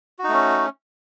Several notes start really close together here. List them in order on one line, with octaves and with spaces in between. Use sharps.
F#4 D#4 A3 C#4